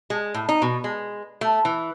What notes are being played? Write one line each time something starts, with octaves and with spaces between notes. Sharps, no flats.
G#3
A2
D#4
B2
G#3
A3
E3